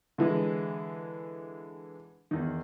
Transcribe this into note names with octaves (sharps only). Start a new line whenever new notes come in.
D3 E3 G#3
E2 D#3